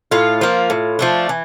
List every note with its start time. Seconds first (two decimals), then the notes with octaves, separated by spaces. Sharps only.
0.11 A2 F4
0.41 F3 A#3
0.70 A2
0.99 F3 A3 D4
1.29 E3